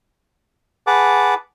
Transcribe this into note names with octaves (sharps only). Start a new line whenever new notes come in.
G#4 B4 F#5 A5 D6